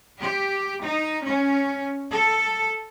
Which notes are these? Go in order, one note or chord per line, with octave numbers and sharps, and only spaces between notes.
G4
D#4
C#4
A4